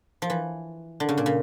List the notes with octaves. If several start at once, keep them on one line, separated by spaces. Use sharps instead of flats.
F3
E3
D3
C#3
A#2
C#3